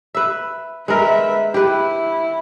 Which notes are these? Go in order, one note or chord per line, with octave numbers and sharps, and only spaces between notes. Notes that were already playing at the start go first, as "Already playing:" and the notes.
B4 E5
G#3 A#4 B4 E5
E4 G4 B4